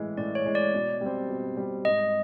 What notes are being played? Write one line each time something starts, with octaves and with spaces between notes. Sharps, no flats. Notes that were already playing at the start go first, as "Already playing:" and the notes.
Already playing: A2 E3 G#3
A2 D5
C#5
E3 G#3
D5
B2
G3 C4
B2
G3 C4
G#2 D#5